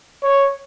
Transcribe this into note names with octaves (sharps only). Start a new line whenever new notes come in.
C#5